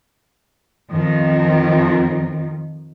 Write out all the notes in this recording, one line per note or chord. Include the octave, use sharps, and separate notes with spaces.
F2 D#3 F3